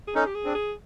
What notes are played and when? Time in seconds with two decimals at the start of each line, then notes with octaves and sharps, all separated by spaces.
0.07 G#4
0.15 C#4 D#4 A4
0.27 G4
0.35 G#4
0.45 C4 D4
0.55 G#4